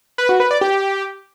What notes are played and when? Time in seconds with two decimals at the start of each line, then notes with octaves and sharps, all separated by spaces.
0.18 B4
0.29 F#4
0.40 B4
0.51 D5
0.61 G4